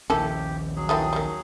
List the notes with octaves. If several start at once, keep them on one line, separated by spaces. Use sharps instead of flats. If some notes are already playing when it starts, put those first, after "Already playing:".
A#1 D#2 A#3 C#4 E4 G4 A4
F#3 G#4
D#3 E3 A3 G5 A5 D#6
D#3 G3